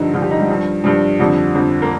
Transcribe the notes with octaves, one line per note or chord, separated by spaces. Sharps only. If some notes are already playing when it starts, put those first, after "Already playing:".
Already playing: G2 D3 F3 D#4
G2 D3 F3 F4
G4
D#4
G3
G2 F3
G2 F3 G3
F2 D3 F3 G3
F2 D3 F3
A#3